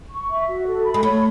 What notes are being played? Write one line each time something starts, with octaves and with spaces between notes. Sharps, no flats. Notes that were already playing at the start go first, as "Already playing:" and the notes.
C#6
E5
F#4
A4
B5
G#3
A3 C#5